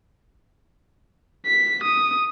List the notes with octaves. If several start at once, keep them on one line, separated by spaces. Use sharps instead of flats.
B6
D#6